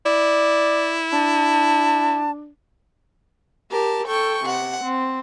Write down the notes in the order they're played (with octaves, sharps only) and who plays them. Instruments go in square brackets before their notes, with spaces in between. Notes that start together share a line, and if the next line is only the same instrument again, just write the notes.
[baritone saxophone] E4 [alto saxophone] D5
[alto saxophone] D4 [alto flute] A5
[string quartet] G4 A#4 A5
A4 G5 C#6
C3 F#5
C4